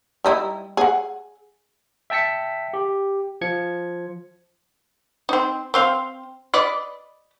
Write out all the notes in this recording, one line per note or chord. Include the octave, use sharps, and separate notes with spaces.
G3 D#4 E4
G#4 F#5
E5 G5 A5 B6 C#7
G4
F3 G#6 C#7
C4 D#4
C4 C5 F5
B4 D5 D#5